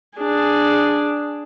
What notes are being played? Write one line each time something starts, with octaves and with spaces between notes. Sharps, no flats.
D4 G#4